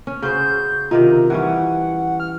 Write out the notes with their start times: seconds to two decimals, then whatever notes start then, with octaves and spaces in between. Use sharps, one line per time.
0.07 C#4
0.22 C#3 F#4 C5 G6
0.91 C3 D#3 D#4 F4
1.30 E3 G3 C#4 F#5
2.20 F6